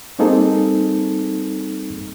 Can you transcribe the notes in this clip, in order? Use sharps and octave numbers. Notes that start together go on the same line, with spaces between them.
G3 A#3 C4 D#4 G#4 A4